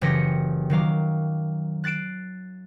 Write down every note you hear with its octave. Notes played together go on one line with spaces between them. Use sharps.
F#1 E3 G4 A#6 C#7
D#3 F#3 F5 D6
F#6 A6 C7 D7 E7